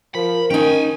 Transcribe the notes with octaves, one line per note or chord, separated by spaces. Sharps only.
F3 A#4 B5
D#3 C#4 D#4 G5 G#5